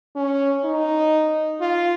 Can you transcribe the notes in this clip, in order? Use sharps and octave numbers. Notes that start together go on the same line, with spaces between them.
C#4
D#4
F4